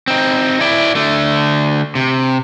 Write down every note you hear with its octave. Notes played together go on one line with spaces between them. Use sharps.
C4 D#4
E4 D5
D3 A3
C3